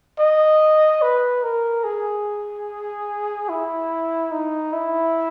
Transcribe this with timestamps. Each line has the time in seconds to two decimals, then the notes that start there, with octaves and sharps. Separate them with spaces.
0.19 D#5
1.02 B4
1.43 A#4
1.84 G#4
3.49 E4
4.32 D#4
4.73 E4